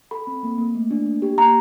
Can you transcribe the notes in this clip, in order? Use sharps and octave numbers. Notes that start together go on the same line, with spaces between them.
A4 B5
C4
A#3
A#3
A3
D4
A#3
G4
A#3 A#5